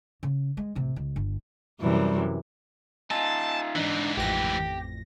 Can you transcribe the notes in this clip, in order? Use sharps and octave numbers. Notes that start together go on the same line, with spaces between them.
C#3
G#3
A1 C3
C#2
G1
F#2 C3 E3 G3
D#4 F4 G#5 A5 E6
G#2 E3 D4 D#4
A1 F2 G4 A#6